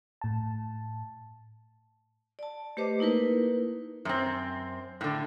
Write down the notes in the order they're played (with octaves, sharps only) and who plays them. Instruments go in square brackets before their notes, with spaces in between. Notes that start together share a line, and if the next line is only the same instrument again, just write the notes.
[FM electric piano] A2 A5
[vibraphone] D5 A5
A3 G4 B4 C5 D#5 D6
A#3 D#4 E4 A#4 B4
[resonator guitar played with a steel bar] F#2 C4
A2 D3